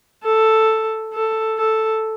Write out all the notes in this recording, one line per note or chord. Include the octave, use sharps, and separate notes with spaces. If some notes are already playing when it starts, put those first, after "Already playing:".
A4
A4
A4